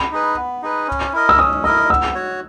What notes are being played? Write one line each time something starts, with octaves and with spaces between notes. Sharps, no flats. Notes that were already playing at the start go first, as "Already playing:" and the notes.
Already playing: B5
D#4 G#4 B4
B3
D#4 G#4 B4
C#4
E4 A#4 D#5
E6
C#4 D#6
E4 A#4 D#5 E6
B3 E6
F#4 C#5